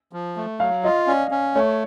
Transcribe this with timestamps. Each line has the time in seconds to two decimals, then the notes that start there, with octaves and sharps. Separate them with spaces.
0.13 F3
0.36 A3
0.60 F#3 F5
0.84 F4 D#5
1.07 C#4 D5
1.31 C#4
1.55 A3 C#5